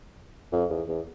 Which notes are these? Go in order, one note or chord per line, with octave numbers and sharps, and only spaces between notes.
F2
E2
E2